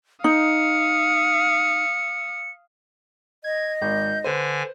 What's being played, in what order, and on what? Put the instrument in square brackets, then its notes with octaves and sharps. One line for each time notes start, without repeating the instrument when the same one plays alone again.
[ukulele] D#4 [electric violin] F5 D#6 [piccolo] C#7
[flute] D#5 [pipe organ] G#6
[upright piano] G#1 [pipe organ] G6
[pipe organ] D3 G#5 [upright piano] B4 C5